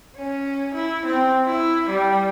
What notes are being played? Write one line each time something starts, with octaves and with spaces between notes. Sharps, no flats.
C#4
E4
C4
E4
G3